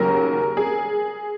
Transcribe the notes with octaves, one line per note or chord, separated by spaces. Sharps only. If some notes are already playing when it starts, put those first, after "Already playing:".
Already playing: D#2 C#3 F#3 C#4 A#4
G#4